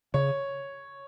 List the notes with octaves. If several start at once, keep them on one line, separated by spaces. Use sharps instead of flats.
C#3 C#5